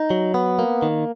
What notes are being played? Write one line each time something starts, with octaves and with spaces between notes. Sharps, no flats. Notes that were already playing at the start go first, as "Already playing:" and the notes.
Already playing: D#4
F#3
B3
A#3
D#3